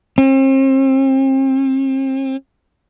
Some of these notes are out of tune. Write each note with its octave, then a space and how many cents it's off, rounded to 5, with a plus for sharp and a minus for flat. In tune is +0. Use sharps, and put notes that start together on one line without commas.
C4 +40